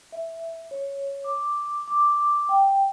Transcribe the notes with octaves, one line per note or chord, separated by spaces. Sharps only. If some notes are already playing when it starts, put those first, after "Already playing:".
E5
C#5
D6
D6
G5